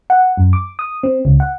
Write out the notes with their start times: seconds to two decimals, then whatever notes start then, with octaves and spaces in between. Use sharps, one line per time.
0.10 F#5
0.37 F#2
0.53 D6
0.79 D#6
1.03 C4
1.25 C#2
1.40 F#5